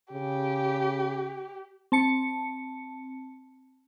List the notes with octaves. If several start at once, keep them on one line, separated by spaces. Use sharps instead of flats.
C#3 G4
C4 A5 C#7